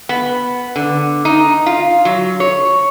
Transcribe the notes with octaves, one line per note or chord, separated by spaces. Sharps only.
B3
D3
D#4
F4
F#3
C#5